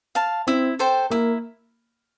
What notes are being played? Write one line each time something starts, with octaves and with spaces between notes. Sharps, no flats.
F5 A5
C4 E4
A4 C5 G5
A#3 E4